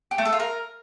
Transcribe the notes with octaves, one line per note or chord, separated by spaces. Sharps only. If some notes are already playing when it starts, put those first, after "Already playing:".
G4
A3
A4
F4
A#4